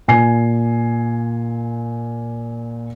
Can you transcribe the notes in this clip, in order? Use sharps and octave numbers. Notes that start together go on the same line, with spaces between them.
A#2 G#5 C7